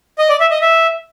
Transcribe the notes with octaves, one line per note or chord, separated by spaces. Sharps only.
D#5
D5
E5
D#5
E5